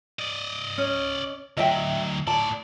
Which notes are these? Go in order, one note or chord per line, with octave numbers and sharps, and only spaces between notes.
D5 D#5
C#4
D2 F#3 D#5 E5 G5
A2 D5 A5